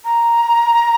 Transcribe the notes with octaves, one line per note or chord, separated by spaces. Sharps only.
A#5